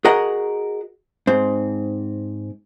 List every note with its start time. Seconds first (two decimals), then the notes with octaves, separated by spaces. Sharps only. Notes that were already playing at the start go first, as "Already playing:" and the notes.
0.05 F#4 G#4 A#4 D#5 F#5
1.27 G#2 C4